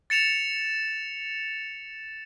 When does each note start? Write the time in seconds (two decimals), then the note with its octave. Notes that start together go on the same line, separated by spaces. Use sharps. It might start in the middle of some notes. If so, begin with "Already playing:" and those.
0.10 A6 C#7 E7 F7